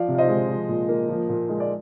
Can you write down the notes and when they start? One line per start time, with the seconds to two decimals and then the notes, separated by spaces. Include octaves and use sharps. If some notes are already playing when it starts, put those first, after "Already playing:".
Already playing: F3 D5 F5
0.08 C3
0.15 F5
0.18 C5 D#5
0.28 G#3
0.49 F3
0.69 A#2
0.89 A#3
1.09 F3
1.29 A#2
1.49 G#3
1.60 D5